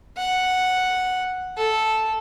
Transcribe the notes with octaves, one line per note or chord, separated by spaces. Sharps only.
F#5
A4